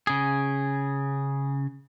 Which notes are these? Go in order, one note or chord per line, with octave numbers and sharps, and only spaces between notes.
C#3 G#4